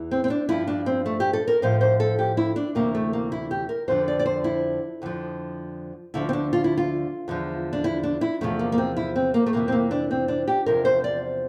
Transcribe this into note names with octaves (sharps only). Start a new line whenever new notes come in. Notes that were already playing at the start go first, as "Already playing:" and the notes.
Already playing: E2 E3
C4
C4
D4
G2 F3 E4
D4
C4
A3
G4
A4
A#4
A2 F3 C5
C5
A4
G4
E4
D4
D2 C3 E3 A#3
A3
A#3
E4
G4
A#4
F2 D3 F3 C5
D5
D5
C5
E4
F2 D3 F3
D2 D3 F3 E4
C4
D4
F4
E4
F4
E2 D3 F3
D4
E4
D4
E4
E2 C3 F3 A3
A#3
A#3
C4
E4
C4
A#3
A3
F2 C3 E3 A#3
C4
A#3
D4
C4
D4
G4
E2 C3 F3 A#4
C5
D5